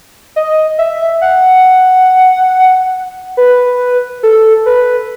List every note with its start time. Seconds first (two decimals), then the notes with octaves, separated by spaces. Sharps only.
0.36 D#5
0.78 E5
1.21 F#5
3.37 B4
4.23 A4
4.66 B4